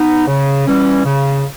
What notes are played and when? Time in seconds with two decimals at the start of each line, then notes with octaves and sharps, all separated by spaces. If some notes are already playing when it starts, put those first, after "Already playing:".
Already playing: B3 D#4
0.27 C#3
0.66 E3 G3 C#4
1.04 C#3